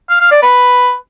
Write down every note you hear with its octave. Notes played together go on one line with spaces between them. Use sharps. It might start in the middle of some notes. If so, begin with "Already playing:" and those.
F5
F5
D5
B4